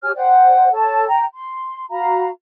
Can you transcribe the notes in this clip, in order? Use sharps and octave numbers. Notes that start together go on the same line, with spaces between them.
G4 C#5 G#5 F6
C5 D5 F#5 G5
A4 C#5 A5
G5 A#5
C6
F#4 F5 A#5 B5